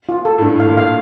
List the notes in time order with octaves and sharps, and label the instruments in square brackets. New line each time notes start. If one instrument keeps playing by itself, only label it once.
[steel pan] F4
A4
[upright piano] A2
[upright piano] G2 [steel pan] A4
[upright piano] A2 [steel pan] F5
[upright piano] A#2
[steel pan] F5